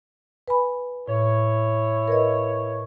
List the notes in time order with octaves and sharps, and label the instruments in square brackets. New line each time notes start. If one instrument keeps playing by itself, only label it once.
[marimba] B4 G#5 B5
[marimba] A2 [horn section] E4 C#5
[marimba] A#4 B4 D#5